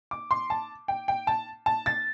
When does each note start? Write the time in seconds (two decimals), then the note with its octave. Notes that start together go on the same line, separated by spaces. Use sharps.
0.11 D6
0.31 C6
0.50 A5
0.88 G5
1.08 G5
1.27 A5
1.66 A5
1.86 A6